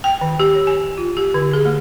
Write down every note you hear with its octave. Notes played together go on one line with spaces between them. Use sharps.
G5
D#3
G4
C#5
G#5
F4
G4
D3
G#4
A3